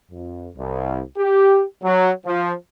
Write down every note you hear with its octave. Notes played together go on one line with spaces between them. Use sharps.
F2
C2
G4
F#3
F3